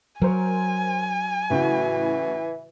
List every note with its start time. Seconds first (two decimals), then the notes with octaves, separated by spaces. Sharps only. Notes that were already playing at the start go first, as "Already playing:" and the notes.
0.22 F#3 A#4 C5 G#5
1.50 A2 C#3 E3 F#4